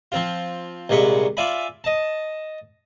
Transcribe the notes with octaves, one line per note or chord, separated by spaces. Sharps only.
F3 C4 F4
C2 A#2 G#3 B5 C#6
F4 D5 E5 G#5 B5
D#5 A5